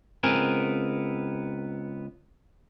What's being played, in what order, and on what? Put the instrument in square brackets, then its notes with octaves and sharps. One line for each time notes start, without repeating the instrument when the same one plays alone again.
[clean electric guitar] C#2 B3 C4 A#4 G#5